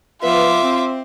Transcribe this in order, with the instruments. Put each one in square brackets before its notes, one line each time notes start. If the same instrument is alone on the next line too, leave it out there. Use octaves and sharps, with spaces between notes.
[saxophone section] F3 B3 B4 [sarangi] F4 [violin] E5 D6
[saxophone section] C4